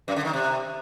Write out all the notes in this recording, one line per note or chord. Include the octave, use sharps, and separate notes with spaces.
F#2
D3
D#3
C3